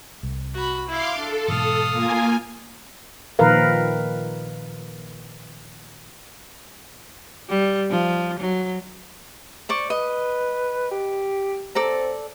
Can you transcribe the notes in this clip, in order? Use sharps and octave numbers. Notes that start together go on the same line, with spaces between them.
C2
F#4 B5
E4 E5 F5 C6 D6
D4 A4
G#2 B2 E3 F5 D#6
A#3 F4 G#5
A#2 D#3 F3 A#4 B4 F5
G3
F3
F#3
C5 D5 C#6
B4 D#5
G4
C4 A4 D5 A#5